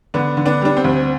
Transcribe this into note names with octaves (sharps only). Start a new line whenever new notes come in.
D3 B3 D4
D3
B3 D4
G3 D4
C4
D2